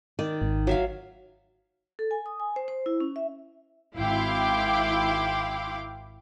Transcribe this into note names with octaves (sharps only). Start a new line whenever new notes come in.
D#3 D5
G#1
F#3 E5 F5
A4
G#5
D#6
G#5
C5
C5
E4
C#4
E5
G#1 E4 F5 G5 C6 D6